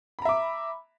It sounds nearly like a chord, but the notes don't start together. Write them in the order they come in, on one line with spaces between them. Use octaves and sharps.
B5 A#5 E5 D6